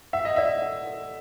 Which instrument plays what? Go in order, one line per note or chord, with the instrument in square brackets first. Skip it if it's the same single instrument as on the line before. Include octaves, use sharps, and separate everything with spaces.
[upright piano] E5 [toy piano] F#5
[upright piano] D#5
[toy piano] D5 [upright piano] E5
[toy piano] F#5
A4